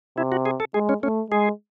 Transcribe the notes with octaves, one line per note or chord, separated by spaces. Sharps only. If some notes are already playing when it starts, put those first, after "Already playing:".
C3 E4
F#4
G#4
A4
G#3 G#4
C#4
A3 C#4
G#3 G#4